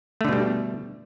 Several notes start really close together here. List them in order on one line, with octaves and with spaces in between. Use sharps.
A3 D3 B2 G3